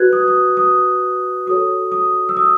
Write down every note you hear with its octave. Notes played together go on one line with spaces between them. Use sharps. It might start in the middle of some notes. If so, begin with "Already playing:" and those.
Already playing: F#4 B4 F#6 G#6
D#6
D#6
D#6
F#4 A4 C#5 D#6
D#6
E6
D#6